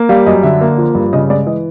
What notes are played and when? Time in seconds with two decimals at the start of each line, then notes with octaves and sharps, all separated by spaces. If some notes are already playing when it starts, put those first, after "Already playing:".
Already playing: A#3
0.09 G3 F5
0.26 F#2 D#5
0.43 D3 E5
0.61 A#3
0.78 F3
0.95 G2
1.13 C#3 D#5
1.30 G#3 D5
1.46 E3 D#5